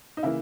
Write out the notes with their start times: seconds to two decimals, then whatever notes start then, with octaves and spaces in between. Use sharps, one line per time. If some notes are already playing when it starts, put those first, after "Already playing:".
0.17 D#4
0.23 C#3 E3 A#3 E4